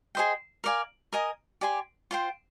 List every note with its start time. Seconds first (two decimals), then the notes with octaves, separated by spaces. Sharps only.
0.15 G#4 C5 D#5 G5
0.64 A#4 D5 F5 G#5
1.13 A#4 D#5 G#5 D#6
1.61 G4 D5 G#5 C6
2.11 F4 C5 G5